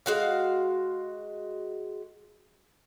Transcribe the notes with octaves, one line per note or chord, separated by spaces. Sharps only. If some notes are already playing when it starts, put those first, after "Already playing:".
G#3 F#4 F5